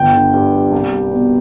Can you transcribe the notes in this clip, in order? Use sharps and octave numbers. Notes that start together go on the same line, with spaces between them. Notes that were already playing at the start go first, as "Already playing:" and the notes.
Already playing: G1 G5
D3
G2
G3
C2
G3
B2